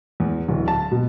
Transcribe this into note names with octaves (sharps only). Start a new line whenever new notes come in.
E2
D1
A5
B2